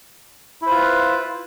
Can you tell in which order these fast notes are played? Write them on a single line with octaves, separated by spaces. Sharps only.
E4 C5 F4 B4